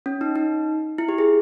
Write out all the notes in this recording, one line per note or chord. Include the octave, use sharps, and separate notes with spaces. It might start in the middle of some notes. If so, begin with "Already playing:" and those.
C#4
D#4
D#4
E4
G4
G#4